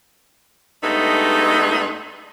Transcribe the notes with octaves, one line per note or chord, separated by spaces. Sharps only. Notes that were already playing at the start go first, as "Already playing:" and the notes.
G2 G#3 A3 B3 D#4